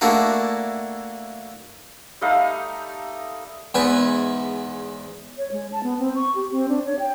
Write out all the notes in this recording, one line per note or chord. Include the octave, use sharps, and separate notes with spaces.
A3 A#3 D4 E4 F#4 A#4
G3 A3 D#4 F5
E2 G#2 B4 G#5
C#5
G#3
A5
B3
C4
C#6
G4
C4
D4
C#5
G5